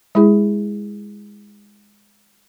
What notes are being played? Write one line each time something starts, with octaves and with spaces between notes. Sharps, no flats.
G#3 E4 G#4